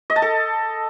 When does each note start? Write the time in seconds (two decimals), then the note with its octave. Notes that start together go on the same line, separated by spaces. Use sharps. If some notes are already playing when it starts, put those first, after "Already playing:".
0.10 D#5
0.16 A5
0.22 A4